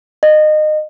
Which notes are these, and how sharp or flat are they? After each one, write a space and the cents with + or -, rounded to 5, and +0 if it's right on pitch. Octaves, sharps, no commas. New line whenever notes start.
D#5 -25